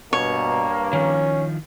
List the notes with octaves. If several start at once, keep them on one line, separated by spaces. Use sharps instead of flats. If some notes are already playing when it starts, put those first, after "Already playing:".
G2 B2 A#3 C#5
D#3 F3 C#4